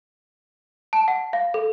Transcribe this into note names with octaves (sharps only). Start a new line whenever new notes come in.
A5
F#5
F5
A4